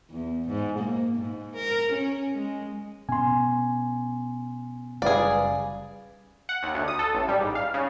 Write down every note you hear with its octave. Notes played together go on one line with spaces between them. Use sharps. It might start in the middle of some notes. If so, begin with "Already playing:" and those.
E2
G#2
A#3
G#2
A#4
C#4
G#3
B2 B3 C#4 G#5 C6
F#1 C#3 G3 G#4 B4 D5 F5
F#5
D#2
D2
D#6
A4
A1
G3
G#2
F5
C#3